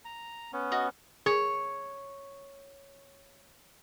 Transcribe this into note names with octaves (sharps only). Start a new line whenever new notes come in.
A#5
B3 C#4
F#4 D#5
G#4 C#5